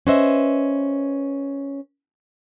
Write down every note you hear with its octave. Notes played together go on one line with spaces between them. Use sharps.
C#4 B4 C5 D#5 E5